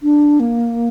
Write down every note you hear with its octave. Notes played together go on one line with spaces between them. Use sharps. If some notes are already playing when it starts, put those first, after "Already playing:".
D4
A#3